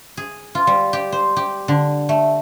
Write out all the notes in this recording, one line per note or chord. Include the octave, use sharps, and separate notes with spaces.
G#4
F4
G3
G4
C5
G4
D3
A3